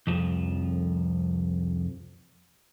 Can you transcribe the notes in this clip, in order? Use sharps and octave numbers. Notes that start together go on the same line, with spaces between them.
C2 F2 F3